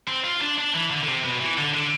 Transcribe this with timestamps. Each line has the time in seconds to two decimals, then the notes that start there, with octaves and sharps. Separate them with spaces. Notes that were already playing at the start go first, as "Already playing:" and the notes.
0.08 C4
0.25 F4
0.41 D4
0.58 D4
0.74 E3
0.91 D3
1.03 D3
1.08 C3
1.24 B2
1.41 E3
1.58 D3
1.74 D3